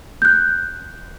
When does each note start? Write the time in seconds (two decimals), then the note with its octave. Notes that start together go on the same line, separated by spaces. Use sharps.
0.22 F#6 G6